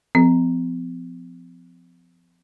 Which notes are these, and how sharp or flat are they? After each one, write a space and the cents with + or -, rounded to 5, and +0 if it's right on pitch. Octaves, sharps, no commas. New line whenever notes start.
F3 +0 C4 -45